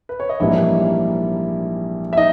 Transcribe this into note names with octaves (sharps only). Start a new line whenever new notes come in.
B4
C#5
D#5
A#1 G#2 E3 G3 A#3 E4 E5
E5
D#4 D#5